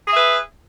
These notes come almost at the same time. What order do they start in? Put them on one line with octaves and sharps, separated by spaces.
G#4 E5 B4